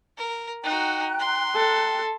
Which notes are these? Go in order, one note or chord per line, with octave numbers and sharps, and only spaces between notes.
A#4
D#4 F#4 G5 A#5 F#6
C6
A4